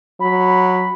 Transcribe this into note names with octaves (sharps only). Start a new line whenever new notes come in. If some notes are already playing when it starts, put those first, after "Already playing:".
F#3 B5